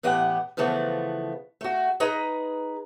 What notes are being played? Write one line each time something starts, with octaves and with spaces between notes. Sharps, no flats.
A2 E3 B3 G4 F#5
C#3 E3 F3 A3 B3
A3 F#4
D#4 G#4 B4 A#5